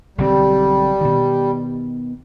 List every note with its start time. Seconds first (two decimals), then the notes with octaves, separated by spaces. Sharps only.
0.18 B1 D3 G3 C4
1.01 B2 D#3